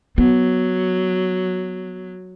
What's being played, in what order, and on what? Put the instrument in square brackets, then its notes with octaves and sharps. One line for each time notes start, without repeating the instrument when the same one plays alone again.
[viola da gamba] F#3 [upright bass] B3